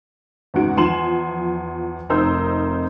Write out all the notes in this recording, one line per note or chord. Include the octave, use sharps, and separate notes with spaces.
E2 G#2 C#3 G#3 F#4 D7
E2 F3 G#5 C6 E7 F#7
F1 C4 D#4 A#4 C5 E6